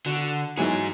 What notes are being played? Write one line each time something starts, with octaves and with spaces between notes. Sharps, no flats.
D3 F#4
G#2 E3 F#3 D#4 G#4